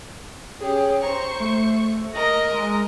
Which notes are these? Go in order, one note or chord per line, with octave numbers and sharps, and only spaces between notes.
C#4 G4 G#4
C5 A#5 C#6
A3
A#4 D#5
G#3